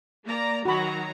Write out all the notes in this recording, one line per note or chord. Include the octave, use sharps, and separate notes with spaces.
A#3 D5 A#5
D#3 F#3 F#4 A#5 B5